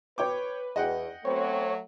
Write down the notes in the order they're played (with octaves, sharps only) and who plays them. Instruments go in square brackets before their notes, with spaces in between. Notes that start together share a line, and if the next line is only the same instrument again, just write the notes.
[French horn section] B4 [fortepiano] C#5 G5 D6
[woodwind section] E2 [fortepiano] D#5 F#5 G5
[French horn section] F#3 A3 [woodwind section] B3 C4 [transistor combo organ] C#5